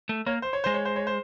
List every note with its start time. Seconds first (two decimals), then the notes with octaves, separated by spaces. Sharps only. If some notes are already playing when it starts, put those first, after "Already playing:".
0.09 A3
0.26 A#3 C#5
0.42 C5
0.53 C#5
0.64 G#3 C5
0.74 C#5
0.85 C5
0.96 C#5
1.07 C5